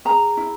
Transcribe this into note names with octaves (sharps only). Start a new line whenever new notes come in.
G#4 A#5
E4